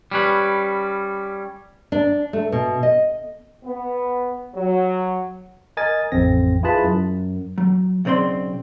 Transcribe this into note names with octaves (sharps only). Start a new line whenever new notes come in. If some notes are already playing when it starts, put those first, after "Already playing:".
G3 C#4 B4
D4
A3
B2
D#5
B3
F#3
A#4 D#5 G#5 A6
A1 F2 C4 A#6
E4 F4 G#4 B4 A5 B5
F#2
F#3
B1 C#3 C4 D5 C6